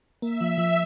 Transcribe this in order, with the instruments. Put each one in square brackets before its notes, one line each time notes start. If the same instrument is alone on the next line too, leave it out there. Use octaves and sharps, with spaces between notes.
[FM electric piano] A#3 [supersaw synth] E5
[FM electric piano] F3
F3